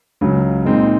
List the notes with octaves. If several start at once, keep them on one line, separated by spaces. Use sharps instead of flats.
C#2 C#3 F#3
A#2 G#3 C4 D#4